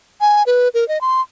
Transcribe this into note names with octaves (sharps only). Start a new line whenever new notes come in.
G#5
B4
A#4
D#5
C6